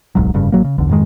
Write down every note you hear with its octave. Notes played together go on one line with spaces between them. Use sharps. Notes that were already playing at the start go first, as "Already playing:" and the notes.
D1 B1 G#2 F#3
F1 G2 C#3
A1 F#3 A#3
C#3
B1 E2 D3
F2 G#2 D#3 G#3